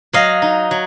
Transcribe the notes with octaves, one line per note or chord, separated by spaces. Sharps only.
F#3 D#5 F5
D#4
F#3